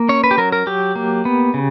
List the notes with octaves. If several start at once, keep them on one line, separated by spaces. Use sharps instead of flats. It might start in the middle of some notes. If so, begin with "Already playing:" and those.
Already playing: A#3
C#4 C#5
B4
G4
F#3 A#4
A#4
F#3 G4
A#3
B3
C#3